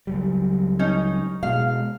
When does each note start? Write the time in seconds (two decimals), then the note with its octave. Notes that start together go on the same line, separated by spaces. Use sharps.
0.07 C#2 F#3 G3
0.79 C#4 D#4
1.43 B2 G#3 F5